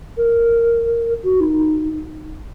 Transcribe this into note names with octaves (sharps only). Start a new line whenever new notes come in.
A#4
F#4
D#4